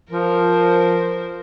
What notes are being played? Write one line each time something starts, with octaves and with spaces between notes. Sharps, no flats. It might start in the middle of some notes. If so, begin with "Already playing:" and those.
F3 A#4 C5